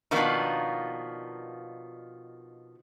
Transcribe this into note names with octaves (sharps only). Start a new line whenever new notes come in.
B2 D#3 F3 A#3 B3 D4